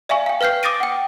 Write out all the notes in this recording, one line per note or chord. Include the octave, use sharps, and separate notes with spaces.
D5 E5 F5 G#5 C#6
F5 G5
B4 F5 F6 G6 C7
D6 D#6 A6 A#6 D7 D#7
F#5 G5